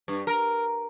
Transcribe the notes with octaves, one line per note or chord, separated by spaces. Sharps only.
G2
A#4